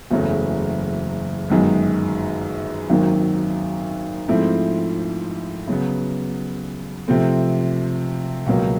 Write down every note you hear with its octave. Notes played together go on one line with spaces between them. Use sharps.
F#1 E2 C#3 F#3 A3
G1 F#2 D#3 G#3
G#1 F#2 D#3 F#3 A#3
G#2 F3 A3 C4 E4
C#3 F#3 B3
C3 F3 A3 C4
C#2 B2 F#3 A#3